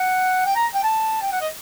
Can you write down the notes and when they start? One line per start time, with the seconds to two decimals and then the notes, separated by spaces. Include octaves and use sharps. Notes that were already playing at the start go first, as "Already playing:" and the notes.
Already playing: F#5
0.46 G5
0.55 A#5
0.74 G5
0.83 A5
1.21 G5
1.32 F#5
1.41 D#5